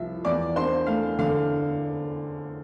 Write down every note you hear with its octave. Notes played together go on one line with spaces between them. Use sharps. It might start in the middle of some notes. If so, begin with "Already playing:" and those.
Already playing: C2 F3 E5
E2 D5 D6
D4 C5 C6
A3 F5
D3 F5